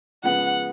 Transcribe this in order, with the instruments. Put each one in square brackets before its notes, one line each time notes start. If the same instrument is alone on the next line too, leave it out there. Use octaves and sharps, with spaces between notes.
[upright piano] C#3 F3 G#3 B3 [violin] F#5